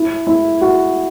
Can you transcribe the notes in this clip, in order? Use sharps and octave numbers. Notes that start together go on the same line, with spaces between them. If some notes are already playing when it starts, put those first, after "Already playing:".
Already playing: E4
E4
F#4